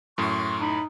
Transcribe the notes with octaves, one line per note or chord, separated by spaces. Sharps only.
F#2 A2 C6 C#6 F6
D#4 B5